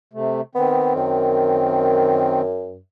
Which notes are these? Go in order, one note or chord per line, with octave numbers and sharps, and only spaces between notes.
C3 A3
D#3 B3 C4
F#2